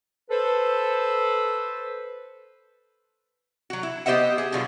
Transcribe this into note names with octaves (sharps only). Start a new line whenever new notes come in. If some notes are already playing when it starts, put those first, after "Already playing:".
A4 B4 C5
F#3 F#4
E4
B3 G4 C5 D#5 E5 F#5
G#4
B2 D3 F#3 G3 B3 F4